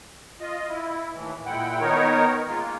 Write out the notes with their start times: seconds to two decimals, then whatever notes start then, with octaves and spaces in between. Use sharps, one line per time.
0.41 F4 D#5
0.69 E4
1.13 D#2 A2 E3
1.46 A#2 G#3 E4 F#5 G5
1.81 D#3 B3 D#4 A#4 C#5
2.48 G#3 A#3 F4